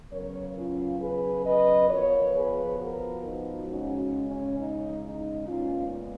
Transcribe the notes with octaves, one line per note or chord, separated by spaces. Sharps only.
C#3 F#3 B3 A#4 C#5
C#4 F4
G#4 B4
B4 D#5
F3 B3 A#4 C#5
G#4 B4
F#4 A#4
D#4 F#4
C#3 G#3 C#4 D#4 F#4
C#4
D#4
D#4
A#2 G#3 B3 C#4 F4